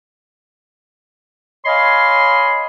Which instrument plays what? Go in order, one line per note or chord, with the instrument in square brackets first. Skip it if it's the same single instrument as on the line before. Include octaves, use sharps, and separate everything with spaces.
[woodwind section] C#5 D#5 F5 G#5 B5 C6